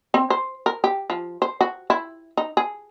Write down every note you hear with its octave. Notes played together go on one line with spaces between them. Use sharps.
C4
C5
A#4
G4
F3
C5
F#4
E4
D#4
G#4